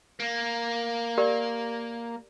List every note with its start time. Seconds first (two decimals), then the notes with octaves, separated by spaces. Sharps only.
0.20 A#3
1.18 G4 A#4 D5